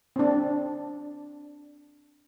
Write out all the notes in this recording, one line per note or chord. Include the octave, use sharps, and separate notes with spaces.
C4 D4